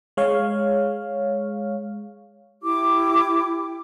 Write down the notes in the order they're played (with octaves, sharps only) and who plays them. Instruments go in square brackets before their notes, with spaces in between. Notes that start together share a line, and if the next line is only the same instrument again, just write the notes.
[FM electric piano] G#3 C#5 F5
[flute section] E4 G4 D6